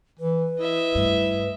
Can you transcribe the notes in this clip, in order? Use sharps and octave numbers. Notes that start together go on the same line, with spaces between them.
E3 B4
E4 D#5 E5
G2 A3